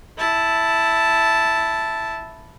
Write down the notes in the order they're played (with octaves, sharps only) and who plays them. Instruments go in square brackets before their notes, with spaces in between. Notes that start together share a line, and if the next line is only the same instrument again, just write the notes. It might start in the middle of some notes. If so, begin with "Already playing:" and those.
[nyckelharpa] E4 A5